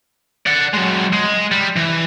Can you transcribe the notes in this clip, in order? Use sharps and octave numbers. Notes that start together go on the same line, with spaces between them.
D5 F#5
F#3 G#3
G#3
G3
E3